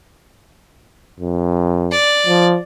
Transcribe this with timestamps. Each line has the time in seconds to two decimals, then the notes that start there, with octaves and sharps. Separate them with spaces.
1.20 F2
1.92 D5
2.27 F3